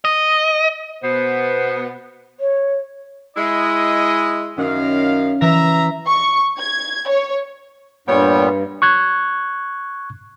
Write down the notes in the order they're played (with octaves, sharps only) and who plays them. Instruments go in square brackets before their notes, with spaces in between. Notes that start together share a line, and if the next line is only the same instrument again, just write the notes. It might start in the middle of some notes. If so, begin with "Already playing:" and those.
[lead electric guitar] D#5
[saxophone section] B2 B3 [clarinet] C5
[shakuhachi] C#5
[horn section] G#3 E4 D#5
[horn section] F#2 D#3 F5 [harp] C#4
[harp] E3 [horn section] E5 A#5
[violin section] C#6
G#6
C#5
[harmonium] G2 [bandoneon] A#2 G3 B3 [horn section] C#5 G5
[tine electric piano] C#6 F#6 G#6